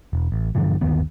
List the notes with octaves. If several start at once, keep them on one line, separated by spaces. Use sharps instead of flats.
E1
A1
G2 D3 E3 F3
G1 D#2 D#3 B3